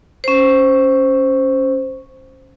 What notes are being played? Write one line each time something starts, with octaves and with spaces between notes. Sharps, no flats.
C#4 C5